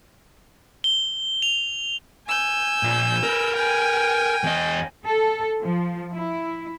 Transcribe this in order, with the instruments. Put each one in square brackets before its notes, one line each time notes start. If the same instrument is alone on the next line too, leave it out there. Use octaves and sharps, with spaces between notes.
[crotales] G7
F7
[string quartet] G#5 E6 G6
[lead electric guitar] A#2 F3
A#4 B4
[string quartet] G5 G#5
[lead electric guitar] E2 D#5
[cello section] A4
F3
E4